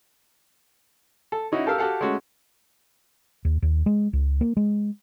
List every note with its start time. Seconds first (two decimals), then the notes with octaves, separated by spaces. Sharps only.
1.32 A4
1.52 C#4 D#4 E4 F#4
1.66 G4 A4 A#4 F5 E6
1.78 F#4 G4 A4 F5 F#5
2.01 G#3 A3 C#4 F#4
3.45 D#2
3.62 D#2
3.86 G#3
4.13 C#2
4.41 A#3
4.57 G#3